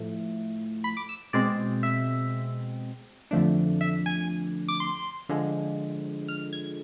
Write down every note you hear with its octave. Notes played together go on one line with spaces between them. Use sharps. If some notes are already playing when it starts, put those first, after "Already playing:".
Already playing: A2 F3 A3
B5
D6
E6
B2 G#3 C4 D5
E5
F2 D3 F3 A3 D4
E5
G#5
D6
C6
D3 F3 G#3
F6
G#6